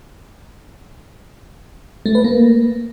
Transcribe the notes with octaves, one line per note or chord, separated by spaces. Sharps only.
A3
B4
A#3